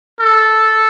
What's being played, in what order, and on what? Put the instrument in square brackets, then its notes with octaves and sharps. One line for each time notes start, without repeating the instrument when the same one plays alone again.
[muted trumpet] A4